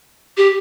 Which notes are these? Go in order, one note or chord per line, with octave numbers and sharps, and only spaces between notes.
G4